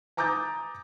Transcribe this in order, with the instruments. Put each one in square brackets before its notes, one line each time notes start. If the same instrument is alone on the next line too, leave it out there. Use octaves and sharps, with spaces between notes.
[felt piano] G#5 A#5 D6 D#6 G6 A6